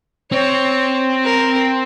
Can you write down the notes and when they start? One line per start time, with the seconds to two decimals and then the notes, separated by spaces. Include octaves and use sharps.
0.32 C4 C#5
1.25 A#4